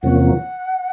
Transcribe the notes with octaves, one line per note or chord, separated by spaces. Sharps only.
E2 C3 F3 A#3 C#4 F#5